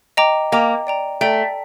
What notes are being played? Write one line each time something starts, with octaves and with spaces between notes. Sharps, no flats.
D#5 G5 A#5 D6
A#3 D#5 G5 A#5 D6
D5 G5 A#5
A3 D5 G5 A#5